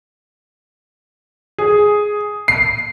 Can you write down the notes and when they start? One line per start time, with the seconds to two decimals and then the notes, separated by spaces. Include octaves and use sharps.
1.58 G#4
2.48 C7